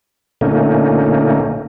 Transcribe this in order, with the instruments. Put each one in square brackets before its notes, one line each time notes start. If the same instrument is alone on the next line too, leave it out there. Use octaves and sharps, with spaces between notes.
[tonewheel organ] A#2 D3 A3 A#3 C#4 D#4